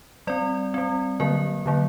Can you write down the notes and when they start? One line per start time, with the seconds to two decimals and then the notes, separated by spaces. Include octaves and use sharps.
0.27 G3 C4 D5
0.74 G3 C4
1.20 D3 F#3 A#3 A#4
1.66 D3 F#3 A#3